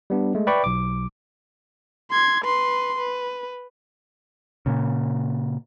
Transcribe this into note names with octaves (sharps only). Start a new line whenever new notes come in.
G3 B3 D4
G#3 A3
B4 D5 E5 G5 B5 C#6
B1 D6
C6 G#6
B4 C6
B4
A#2 C#3